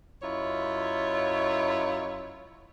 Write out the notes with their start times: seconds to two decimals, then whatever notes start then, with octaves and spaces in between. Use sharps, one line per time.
0.23 F#2 E4 F4 C#5 D#5